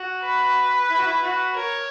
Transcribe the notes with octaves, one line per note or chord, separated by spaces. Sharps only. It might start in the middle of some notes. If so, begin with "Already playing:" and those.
Already playing: F#4
B4
E4
F#4
E4
F#4
A#4 C#5